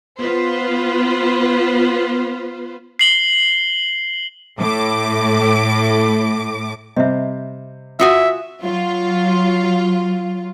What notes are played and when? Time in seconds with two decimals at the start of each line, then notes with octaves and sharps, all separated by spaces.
0.19 B3 F4 B4 C5
2.99 C7 F#7 G7
4.60 A2 D6
6.96 C3 G3 C5 D#5 E5
8.00 F4 F#4 E5 F#5 G#5 D#6 E6
8.63 F#3 F4